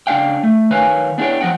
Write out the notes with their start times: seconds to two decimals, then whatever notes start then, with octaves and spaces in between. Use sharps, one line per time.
0.07 C#3 D4 F#4 D5 F5 G5
0.43 A3
0.70 D#3 B4 C#5 F5 G#5
1.18 B3 D4 E4 G#4 C#5 G5
1.41 F3 D#5 F#5 G5